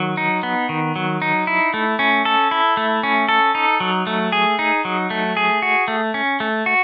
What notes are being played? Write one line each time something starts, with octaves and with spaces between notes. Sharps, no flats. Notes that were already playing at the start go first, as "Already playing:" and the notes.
Already playing: D#3 F#3
D#4
B3
D#3
F#3
D#4
E4
A3
C#4
A4
E4
A3
C#4
A4
D#4
F#3
A3
G#4
D#4
F#3
A3
G#4
F#4
A3
C#4
A3
F#4